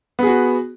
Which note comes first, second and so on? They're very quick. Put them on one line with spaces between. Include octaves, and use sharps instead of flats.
B3 G#4 F#4